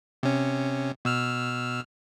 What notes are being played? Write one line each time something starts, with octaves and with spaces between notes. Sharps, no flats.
C3 C#4
B2 E6 F6